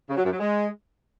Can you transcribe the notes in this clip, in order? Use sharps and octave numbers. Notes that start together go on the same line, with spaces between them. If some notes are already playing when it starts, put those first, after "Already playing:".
C#3
F#3
F#2
F#3
G#3